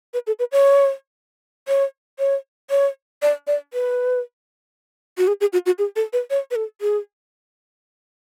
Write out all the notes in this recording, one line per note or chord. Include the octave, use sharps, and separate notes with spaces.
B4
A4
B4
C#5
C#5
C#5
C#5
D5
D5
B4
F#4
G#4
G#4
F#4
F#4
G#4
A4
B4
C#5
B4
A4
G#4